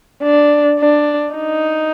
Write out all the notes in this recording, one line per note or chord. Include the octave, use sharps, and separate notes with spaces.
D4
D4
D#4